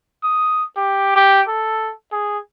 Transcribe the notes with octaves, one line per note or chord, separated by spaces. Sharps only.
D#6
G4
G4
A4
G#4